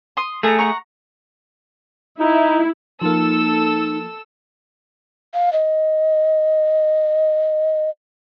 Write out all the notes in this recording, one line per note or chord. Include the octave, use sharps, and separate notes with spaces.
C6 D#6
A3 G#4 A4 A#5
F#5 A#5 C#6
D#4 E4
F3 A#3 D#4 A4 E6
F5
D#5